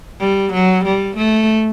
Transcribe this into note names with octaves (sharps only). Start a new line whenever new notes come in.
G3
F#3
G3
A3